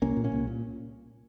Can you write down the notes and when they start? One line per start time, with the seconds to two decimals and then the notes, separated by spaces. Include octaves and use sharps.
0.02 C2 A#3 C#4
0.16 A#2
0.24 A#3 C#4
0.32 C2
0.47 A#2